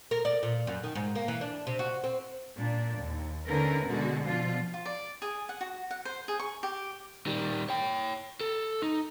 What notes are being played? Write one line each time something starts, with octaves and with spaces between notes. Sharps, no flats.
A#4
D5
A#2
F#2
D#3
G#2
A#3
E3
D4
C3
F#4
C4
A#2 D4
D#2
D3 A3 C#4 D#4 A#4 B4
B2 D3 G#3 F#4
B2 F3 D4 F4
F4
D5
G#4
F#5
F#4
F#5
C5
G#4
C#6
G4
D#3 G3
C#5 G5
A4
D#4